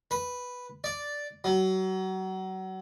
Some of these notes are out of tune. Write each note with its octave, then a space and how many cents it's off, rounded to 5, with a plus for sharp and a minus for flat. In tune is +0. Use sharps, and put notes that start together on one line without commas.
B4 +0
D5 -5
F#3 +30